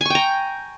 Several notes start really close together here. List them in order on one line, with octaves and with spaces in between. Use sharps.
G#5 C#6 G5 A#5